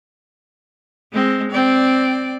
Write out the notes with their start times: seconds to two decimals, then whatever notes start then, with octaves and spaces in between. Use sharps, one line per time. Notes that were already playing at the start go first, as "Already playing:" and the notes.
1.13 G#3 C4
1.51 C4 D5